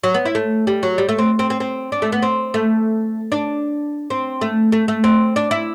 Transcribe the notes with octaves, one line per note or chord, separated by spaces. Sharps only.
F#3
B3
E4
A3
G3
F#3
G3
A3
C4
C4
C4
C4
D4
A3
B3
C4
A3
D4
C4
A3
A3
A3
C4
D4
E4